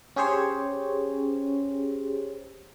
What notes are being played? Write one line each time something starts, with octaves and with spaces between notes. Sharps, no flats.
C#4 G4 G#4 C5 C#5